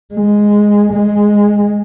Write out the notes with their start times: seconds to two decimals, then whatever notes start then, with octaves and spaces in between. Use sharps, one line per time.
0.15 G#3
0.93 G#3